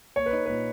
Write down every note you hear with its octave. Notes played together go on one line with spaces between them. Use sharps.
A#3 C#5
B4
D#4
A#2 B4